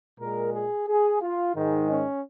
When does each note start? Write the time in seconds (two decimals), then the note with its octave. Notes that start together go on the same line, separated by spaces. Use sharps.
0.19 A#2 G#3 A#4
0.53 G#4
0.88 G#4
1.21 F4
1.55 G#2 D#3 G#3 D#4
1.90 C#4